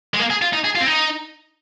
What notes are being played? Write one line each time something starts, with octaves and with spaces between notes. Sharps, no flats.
G#3
A#3
G#4
F4
D#4
G#4
F4
C4
D#4